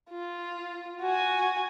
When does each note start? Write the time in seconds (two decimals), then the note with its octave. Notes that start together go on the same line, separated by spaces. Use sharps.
0.11 F4
1.02 F#4 G#5